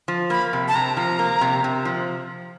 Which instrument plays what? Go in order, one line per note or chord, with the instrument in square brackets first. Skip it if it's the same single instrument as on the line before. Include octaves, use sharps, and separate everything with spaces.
[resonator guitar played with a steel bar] F3
[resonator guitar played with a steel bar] A#3 [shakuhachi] B5
[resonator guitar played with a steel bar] C3
[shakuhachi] A5
[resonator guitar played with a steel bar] C3 [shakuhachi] A#5
[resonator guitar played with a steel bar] F3
A#3
C3
C3
F3